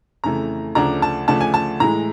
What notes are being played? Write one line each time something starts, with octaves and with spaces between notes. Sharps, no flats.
F2 C#3 E3 A3 A#5
D2 C#3 F3 A3 D4 A#5
A5
D2 C#3 F3 A3 D4 A5
G#5
A5
A2 E3 G#3 A#5